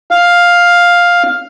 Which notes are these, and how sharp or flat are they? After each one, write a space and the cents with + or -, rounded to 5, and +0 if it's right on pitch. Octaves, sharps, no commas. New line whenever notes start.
F5 +5